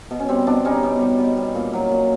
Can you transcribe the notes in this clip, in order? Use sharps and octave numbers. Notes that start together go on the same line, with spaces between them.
B2
C#4
G3 C4
B2 C4 D4
G3 C#4 D#4
B2
G3
B2
G3
A#2
F#3
A#2